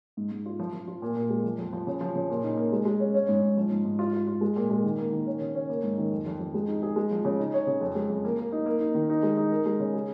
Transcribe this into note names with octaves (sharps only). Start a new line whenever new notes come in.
G#2
G#2
F4
F3
F3
F4
A#2
A#2
G#3
F3
F2
F3
C#3
F3
C#3
A#2
D#4
A#3
G#3
G#3
C#4
C#4
G#2
G#2
F3
G#2
G#2
F4
F4
F4
G#3
A#2
G#3
D#3
A#3
D#3
C#4
C#3
C#4
A#3
G#2
D#3
F2
F2
F2
G#3
D#4
G#4
G#3
F3
C#3
D#4
C#5
C#3
F2
G#3
F2
A#3
A#3
D#4
A#3
D#4
D#3
D#4
G#3
D#4
A#4
G#3
C#3
G#4